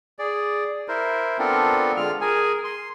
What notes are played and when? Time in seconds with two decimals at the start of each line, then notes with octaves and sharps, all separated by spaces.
0.19 G#4 D5
0.88 E4 A#4 C5
1.39 B3 C4 D4 F4 A4 A#4
1.97 D3 G#3 F4 F6
2.21 G#4 A#4 G#5
2.64 C6